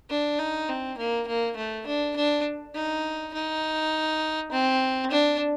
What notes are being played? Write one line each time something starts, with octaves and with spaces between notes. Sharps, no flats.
D4
D#4
C4
A#3
A#3
A3
D4
D4
D#4
D#4
C4
D4